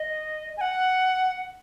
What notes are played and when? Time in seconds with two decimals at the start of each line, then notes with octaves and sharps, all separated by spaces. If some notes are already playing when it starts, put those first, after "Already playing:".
Already playing: D#5
0.57 G#5
0.61 F#5